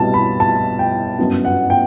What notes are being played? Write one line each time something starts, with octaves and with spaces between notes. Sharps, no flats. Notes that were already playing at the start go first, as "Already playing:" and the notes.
Already playing: C2 B2 G3 A5
B5
A5
G5
G1 F#2 F#3 B3
F#5
G5